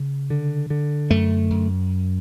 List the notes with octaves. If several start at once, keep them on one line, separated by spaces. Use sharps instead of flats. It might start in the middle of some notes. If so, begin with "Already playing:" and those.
Already playing: C#3
D3
D3
F#2 A3
F#2